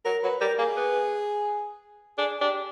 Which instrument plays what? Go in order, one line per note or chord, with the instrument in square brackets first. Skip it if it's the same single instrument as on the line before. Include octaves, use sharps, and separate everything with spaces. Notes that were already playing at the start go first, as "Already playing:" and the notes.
[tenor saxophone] F#3 [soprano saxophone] A#4
[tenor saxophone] F#3 [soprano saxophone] B4
[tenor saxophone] G3 [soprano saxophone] A#4
[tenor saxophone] A#3 [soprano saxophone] G#4
[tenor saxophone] B3
[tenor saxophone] D4 [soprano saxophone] G#4
[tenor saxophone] D4 [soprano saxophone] G4